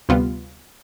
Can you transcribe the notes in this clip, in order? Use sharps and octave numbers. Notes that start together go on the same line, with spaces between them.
D2 C3 G3 B3 F4